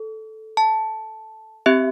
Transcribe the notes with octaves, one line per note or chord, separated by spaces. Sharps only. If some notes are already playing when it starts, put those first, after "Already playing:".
Already playing: A4
A5
C4 G4 E5